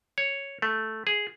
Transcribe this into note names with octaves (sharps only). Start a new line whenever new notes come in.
C#5
A3
G#4